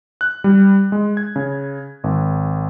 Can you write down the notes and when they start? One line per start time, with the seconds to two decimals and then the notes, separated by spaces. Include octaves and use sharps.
0.21 F#6
0.44 G3
0.92 G#3
1.17 G#6
1.36 C#3
2.04 G#1